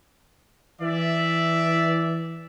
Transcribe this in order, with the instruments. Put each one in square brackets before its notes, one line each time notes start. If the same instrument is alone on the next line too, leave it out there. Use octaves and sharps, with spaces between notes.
[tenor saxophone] E3 [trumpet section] D5 E5